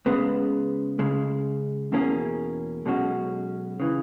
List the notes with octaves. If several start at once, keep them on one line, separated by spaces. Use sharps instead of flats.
C#2 C#3 G#3 B3
C#2 C#3 G#3
E2 B2 A#3 C#4 G#4
B1 B2 G#3 C#4 F#4
C#3 E3